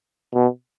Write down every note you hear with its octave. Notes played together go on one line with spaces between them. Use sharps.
B2